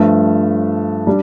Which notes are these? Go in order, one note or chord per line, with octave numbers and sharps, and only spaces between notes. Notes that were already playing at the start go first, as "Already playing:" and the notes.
Already playing: G2 F3 A3
G3 D4